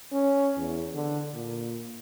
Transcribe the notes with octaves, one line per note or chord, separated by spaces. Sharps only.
C#4
E2
D3
A#2